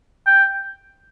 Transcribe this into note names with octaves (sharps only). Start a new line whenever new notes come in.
G5